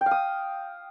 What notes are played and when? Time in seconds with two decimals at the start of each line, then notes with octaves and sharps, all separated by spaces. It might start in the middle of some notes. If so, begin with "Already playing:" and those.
0.01 G5
0.06 F5
0.11 D#6